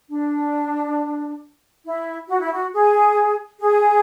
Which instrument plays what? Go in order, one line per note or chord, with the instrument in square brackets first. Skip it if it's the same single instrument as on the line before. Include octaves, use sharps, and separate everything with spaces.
[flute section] D4
E4
F#4
E4
F#4
G#4
G#4